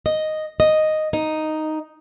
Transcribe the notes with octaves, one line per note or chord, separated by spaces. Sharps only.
D#5
D#5
D#4